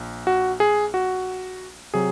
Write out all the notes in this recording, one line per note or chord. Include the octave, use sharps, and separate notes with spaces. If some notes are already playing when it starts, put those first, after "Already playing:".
Already playing: A#1
F#4
G#4
F#4
C3 F#3 G#4